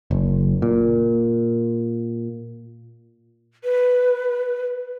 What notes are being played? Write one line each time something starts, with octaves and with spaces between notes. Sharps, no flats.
F#1
A#2
B4